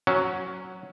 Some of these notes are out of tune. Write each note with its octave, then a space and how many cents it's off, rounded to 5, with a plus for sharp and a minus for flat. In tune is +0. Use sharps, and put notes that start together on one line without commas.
F#3 +0 C#4 +0 F#4 +0